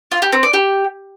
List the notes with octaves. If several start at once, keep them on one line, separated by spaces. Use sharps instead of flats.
F4
G4
C4
D5
G4